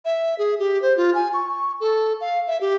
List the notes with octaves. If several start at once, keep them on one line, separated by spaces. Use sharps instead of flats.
E5
G#4
G4
C5
F4
G#5
C#6
A4
F5
E5
G4